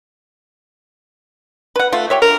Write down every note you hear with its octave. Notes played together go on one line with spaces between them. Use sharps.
B4 F#5
A3 F4
G4 C#5 E5
D3 A#4